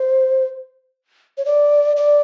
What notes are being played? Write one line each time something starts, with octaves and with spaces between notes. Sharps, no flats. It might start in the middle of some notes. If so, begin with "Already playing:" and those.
Already playing: C5
C#5
D5
D5